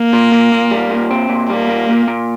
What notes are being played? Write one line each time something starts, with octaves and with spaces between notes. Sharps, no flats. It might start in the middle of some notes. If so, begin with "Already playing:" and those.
Already playing: A#3
A#2
A#2
A#2
G3
A#2
C4
A#2
G3 A#3
A#2
A#2
A#2